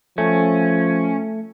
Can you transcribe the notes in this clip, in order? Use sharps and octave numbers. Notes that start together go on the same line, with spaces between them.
F3 A3 C#4